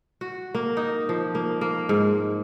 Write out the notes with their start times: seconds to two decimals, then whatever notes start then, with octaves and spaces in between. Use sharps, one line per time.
0.21 F#4
0.55 A#3
0.77 D#4
1.09 F3
1.35 A#3
1.61 A#3
1.89 G#2